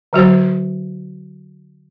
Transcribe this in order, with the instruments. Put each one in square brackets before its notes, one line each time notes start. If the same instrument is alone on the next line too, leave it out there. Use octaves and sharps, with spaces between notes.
[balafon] D3 F#3 F#4 C5